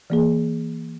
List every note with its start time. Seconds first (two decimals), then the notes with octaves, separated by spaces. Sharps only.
0.10 E3 A#3 G#4